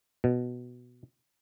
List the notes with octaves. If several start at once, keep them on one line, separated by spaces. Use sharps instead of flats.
B2